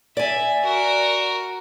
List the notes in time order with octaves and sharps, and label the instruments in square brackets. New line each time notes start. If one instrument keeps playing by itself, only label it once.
[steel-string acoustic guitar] D5 G#5 [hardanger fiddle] E5
[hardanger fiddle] F#4 A#4